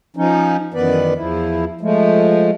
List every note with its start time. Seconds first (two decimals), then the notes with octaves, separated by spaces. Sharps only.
0.17 F3 C#4 D#4
0.74 F#2 D#3 E3 B3 B4 D5
1.16 E2 F3 E4
1.81 F3 G#3 A3